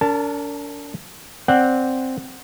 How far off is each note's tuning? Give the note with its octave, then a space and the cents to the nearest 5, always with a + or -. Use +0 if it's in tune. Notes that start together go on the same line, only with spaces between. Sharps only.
D4 -40 A#4 -30 A5 +0
C4 +0 D5 +0 F#5 +0